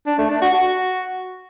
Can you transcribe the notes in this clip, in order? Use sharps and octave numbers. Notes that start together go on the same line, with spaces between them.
D4
A3
D4
F#4
F#4